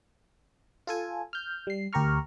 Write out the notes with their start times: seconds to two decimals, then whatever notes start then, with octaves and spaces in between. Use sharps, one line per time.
0.87 F4 A4 G#5
1.33 F6 G6
1.67 G3 C7
1.93 D2 G4 A#4 A#5 C#6 F6